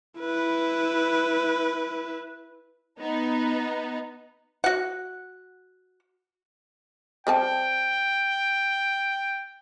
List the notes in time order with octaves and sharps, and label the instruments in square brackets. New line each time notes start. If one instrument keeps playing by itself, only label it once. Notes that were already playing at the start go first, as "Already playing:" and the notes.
[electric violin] E4 B4
[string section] B3 D#4
[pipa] F#4 F#5
[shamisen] G3 C4 A5 [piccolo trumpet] G5